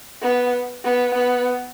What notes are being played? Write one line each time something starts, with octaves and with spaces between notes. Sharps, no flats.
B3
B3
B3